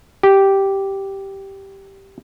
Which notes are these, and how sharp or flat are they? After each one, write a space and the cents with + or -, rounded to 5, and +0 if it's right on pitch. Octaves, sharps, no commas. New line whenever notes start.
G4 -5